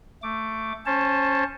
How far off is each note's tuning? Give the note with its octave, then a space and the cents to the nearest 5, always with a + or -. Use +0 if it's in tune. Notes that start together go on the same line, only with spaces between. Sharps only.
A3 +10 D6 +0
C#4 -5 C5 +20 A5 +0